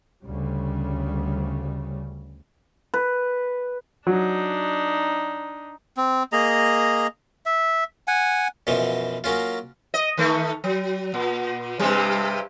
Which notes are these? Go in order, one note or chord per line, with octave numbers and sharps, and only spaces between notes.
D2 C#3 G3
B4
F#3 D4 D#4
C4
A#3 G#4 D#5 A#5
E5
F#5 G#5
F#2 B2 E3 F3
F#3 A#3 C#4 F4
D#5
D#3 A3
F#3
A#2
G2 C3 G3